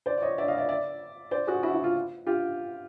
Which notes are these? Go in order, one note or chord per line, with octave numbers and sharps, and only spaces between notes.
C5 D5
D5
C#5 D#5
D5 E5
D#5 F5
D5 E5
D5 E5
C5 D5
F#4 G#4
E4 F#4
E4
F4
F4 G4